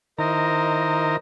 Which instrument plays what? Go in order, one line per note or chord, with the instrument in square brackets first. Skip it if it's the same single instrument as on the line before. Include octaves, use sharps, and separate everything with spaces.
[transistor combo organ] D#3 E4 A#5 [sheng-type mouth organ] A#4 C5 D#5